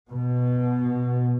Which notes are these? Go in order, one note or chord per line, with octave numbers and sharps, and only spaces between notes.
B2